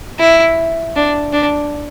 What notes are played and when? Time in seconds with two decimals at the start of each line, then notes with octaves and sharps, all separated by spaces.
0.19 E4
0.96 D4
1.33 D4